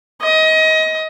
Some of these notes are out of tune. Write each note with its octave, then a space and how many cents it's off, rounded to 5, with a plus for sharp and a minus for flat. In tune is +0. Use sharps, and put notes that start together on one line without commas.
D#5 +25